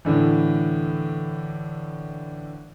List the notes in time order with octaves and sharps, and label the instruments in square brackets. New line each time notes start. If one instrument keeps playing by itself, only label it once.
[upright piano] A2 D3 E3